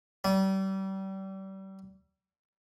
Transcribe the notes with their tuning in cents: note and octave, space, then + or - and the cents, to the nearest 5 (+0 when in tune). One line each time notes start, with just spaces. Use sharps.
G3 -30